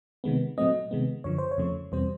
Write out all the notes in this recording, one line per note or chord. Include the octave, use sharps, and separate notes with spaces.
C3 D#3 G#3 B3
A#2 F#3 A3 C4 D#5
C3 D#3 G#3 B3
F#2 D3 F3 C#5
C5
C#5
F2 C#3 F3 A3
E2 B2 G3 C4 C5